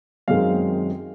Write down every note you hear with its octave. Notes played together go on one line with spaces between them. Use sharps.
F#2 D#3 G#3 C4 F5